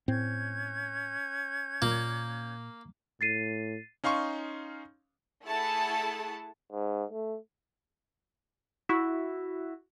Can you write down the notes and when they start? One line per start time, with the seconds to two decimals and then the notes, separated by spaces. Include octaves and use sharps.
0.08 A2 C4 C#4 G6 G#6
1.82 A#2 A#3
3.21 A2 A6 C7 D#7
4.04 C#4 D#4 F5 C6 C#6
5.45 A3 E4 G#4 A4 F#5 A5
6.72 G#2
7.11 A3
8.89 E4 F#4 E5